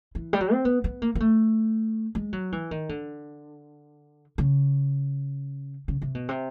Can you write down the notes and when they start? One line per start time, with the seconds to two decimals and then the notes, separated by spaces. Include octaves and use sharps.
0.15 E3
0.33 G3
0.41 F#3
0.52 C4
0.65 B3
0.84 B3
1.02 A#3
1.15 A#3
1.20 A3
2.15 G#3
2.33 F#3
2.52 E3
2.71 D#3
2.89 D3
4.38 C#3
5.88 C#3
6.02 C3
6.15 B2
6.29 C3